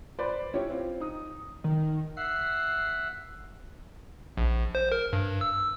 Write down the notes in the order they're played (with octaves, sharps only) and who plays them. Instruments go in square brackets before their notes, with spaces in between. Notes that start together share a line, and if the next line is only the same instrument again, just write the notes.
[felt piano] B4 C5 D5 B5 C6
C#4 E4 G4 C#5
C4 F4
D#4 D#6
[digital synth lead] D#3
[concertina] E5 F#5 [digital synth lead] C7
[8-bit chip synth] A#1
C5
A#4
G2
E6